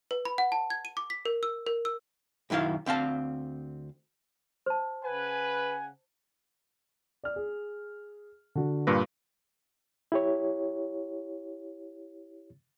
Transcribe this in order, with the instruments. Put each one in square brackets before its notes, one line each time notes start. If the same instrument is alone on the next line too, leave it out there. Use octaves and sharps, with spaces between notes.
[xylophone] B4
B5
F#5
A5
G#6
D#7
D6
B6
A#4
E6
A#4
E6
[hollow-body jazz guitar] B1 F#2 D#3 E4 F5
D2 C4 F5 A5
[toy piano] C5 A5
[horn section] C#3 F#5 G#5 [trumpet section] B4
[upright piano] D5 F6
G#4
D3 F#4
[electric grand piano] G2 A#2 B4 [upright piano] A#6
[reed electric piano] E4 G4 C#5